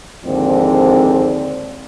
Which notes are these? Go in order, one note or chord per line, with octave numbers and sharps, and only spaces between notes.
D#2 G#2 D3 F3 C4 D5